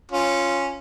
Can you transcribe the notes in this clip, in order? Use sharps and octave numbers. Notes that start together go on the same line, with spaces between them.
C#4 F4